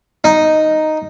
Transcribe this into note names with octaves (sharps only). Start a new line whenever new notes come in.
D#4